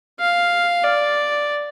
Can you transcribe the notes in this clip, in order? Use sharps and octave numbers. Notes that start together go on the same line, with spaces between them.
F5
D5